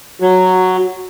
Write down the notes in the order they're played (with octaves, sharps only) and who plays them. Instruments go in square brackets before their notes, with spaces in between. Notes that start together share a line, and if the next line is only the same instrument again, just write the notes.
[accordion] F#3 [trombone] F#4